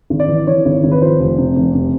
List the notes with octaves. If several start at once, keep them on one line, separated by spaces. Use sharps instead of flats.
G#1
D5
E3
E3 C#5
G#1
G#1
B4
F3 C5
F1
C3
F1
C3